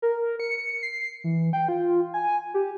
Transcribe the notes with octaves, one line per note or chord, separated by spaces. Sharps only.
A#4
C#7
C7
E3
G5
F4
G#5
G4